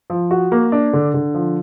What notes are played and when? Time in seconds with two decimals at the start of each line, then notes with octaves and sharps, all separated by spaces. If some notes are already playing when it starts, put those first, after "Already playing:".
0.10 F3
0.31 F#4
0.52 A#3
0.72 D4
0.93 D3
1.14 D3
1.34 F3